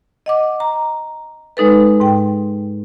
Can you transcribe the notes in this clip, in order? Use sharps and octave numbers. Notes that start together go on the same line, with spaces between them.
D#5 F#5 D6
A#5
G#3 D#4 A4 B4
G#2 G5